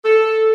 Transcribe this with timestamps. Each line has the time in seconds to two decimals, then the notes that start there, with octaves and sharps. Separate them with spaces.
0.05 A4